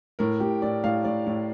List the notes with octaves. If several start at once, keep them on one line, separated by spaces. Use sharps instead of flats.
A2 A#4
A2 G4
A2 D5
A2 F5
A2 D5
A2